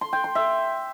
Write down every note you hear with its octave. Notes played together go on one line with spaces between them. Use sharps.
C6
G5
C6
E5